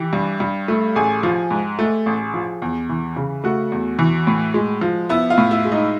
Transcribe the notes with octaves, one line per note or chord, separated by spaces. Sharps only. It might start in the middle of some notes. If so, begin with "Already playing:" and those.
Already playing: E3 G4 G5
G2
G2
A3
A1 G#4 G#5
F3
G#2
A3
A1
F3
E2
E3
C#3
A3 F#4 F#5
E2
E3
A2
G#3
F3
B3 E4 E5
F4 F5
A2
E4 E5
G#3
D#4 D#5